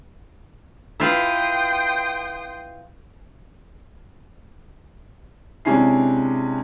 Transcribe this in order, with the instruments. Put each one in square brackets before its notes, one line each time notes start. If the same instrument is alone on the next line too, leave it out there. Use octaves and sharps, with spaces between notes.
[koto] E4 F4 B4 [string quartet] G5 C6 D#6
[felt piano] C3 G#3 C#4 D4 E4 C7